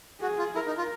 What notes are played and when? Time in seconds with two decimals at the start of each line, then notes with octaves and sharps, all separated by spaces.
0.21 F#4 G#4
0.38 F4
0.55 E4 A#4
0.67 D#4
0.78 F4